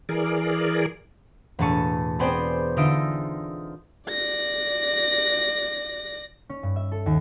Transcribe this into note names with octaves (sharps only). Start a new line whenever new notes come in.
E3 G#4 A#4 D5
E1 A2 A3 A5 C#6 D#7
B3 C4 G#4 C5 D5 G5
D3 D#4 F4 D#5 E5 D7
D5 A#6
C#4
G2
E5
A4
D#2